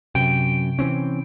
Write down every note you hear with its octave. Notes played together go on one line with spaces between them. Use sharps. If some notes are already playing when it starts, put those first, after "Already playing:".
F#2 C3 G5 D7
E3 C4 C#4